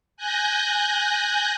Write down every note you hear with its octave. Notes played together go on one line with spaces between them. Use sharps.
G#5 F#6 G6 A#6